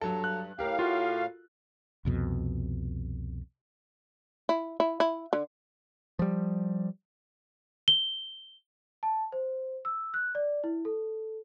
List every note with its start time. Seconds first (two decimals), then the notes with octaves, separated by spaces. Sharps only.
0.01 G2 F#3 A4
0.24 F#6
0.59 A2 G4 A#4 F5
0.79 F4 F#4 A4
2.05 C2 F2 B2
4.49 E4
4.80 E4
5.00 E4
5.33 D3
6.19 F3 G3
7.88 G7
9.03 A5
9.32 C5
9.85 E6
10.14 F#6
10.35 D5
10.64 E4
10.85 A4